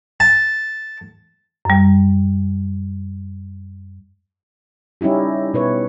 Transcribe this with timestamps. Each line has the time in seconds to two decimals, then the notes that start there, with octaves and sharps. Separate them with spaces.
0.20 A5
1.65 F#2 G3
5.01 G3 C#4 D#4 E4 G4
5.54 B2 B4 C#5